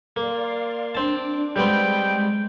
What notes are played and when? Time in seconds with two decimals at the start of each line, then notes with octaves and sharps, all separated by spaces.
0.16 A#3 D5 F5 C6
0.95 C4 D4 A5 D6
1.56 G3 G#3 B3 C4 G5